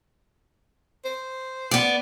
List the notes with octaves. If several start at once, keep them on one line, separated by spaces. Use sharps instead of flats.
C5
B3 D5